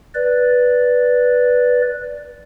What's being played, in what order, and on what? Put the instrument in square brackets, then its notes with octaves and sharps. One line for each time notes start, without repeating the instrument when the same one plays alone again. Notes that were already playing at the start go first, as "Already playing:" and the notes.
[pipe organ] B4 D5